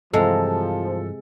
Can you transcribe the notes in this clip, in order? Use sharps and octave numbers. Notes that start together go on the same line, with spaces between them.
G2 C3 E3 F3 G#3 A4 A#5